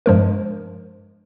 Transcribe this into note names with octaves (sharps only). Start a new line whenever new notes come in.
G2 F3 G#3 A#4